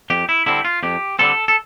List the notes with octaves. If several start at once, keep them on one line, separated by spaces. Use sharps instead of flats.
F2 G4
E4
D3 G3 C4 E4
F4
F2 G4
D3 G3 C4 A4
A4